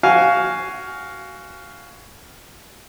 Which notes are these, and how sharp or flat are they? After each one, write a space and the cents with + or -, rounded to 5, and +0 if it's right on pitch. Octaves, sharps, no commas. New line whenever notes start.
F#4 +15 F5 +0 G#5 +0